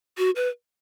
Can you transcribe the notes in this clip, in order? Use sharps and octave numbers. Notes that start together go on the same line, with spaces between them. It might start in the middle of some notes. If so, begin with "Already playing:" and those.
F#4
B4